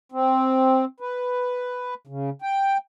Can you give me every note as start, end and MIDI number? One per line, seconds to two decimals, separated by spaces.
0.12 0.85 60
1.00 1.94 71
2.07 2.30 49
2.42 2.77 79